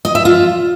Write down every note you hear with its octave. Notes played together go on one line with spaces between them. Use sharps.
D#5
E5
F4